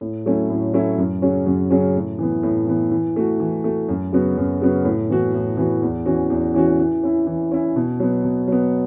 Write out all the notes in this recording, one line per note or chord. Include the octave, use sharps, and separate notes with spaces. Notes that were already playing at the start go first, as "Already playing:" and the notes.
A2
F#3 A3 C#4 E4
A2
F#3 A3 C#4 E4
F#2
C#3 F#3 C#4
F#2
C#3 F#3 C#4
A2
E3 B3
A2
E3 B3
E3
A3 F#4
E3
A3 F#4
F#2
C#3 F#3 B3 F#4
F#2
C#3 F#3 B3 F#4
A2
E3 B3 F#4
A2
E3 B3 F#4
E2
E3 C#4 F#4
E2
E3 C#4 F#4
E3
C#4 E4
E3
C#4 E4
B2
F#3 B3
B2
F#3 B3